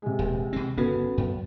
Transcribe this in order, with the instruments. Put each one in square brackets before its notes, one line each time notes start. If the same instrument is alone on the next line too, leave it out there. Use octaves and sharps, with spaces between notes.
[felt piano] C3 G#3
[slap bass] D#1
B2 C4
[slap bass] G1 C#3 C#4 [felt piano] B3 F#4 A4
[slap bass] F#2